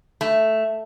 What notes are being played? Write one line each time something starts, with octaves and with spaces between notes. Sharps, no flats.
A3